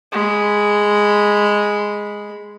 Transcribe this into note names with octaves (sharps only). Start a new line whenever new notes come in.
G#3 B5